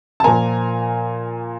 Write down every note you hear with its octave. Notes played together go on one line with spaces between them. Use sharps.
A5
A#2 F3 A#3 G#5 A#5